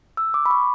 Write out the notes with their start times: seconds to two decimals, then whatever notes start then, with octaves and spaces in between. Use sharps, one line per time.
0.17 E6
0.34 D6
0.46 B5
0.51 C#6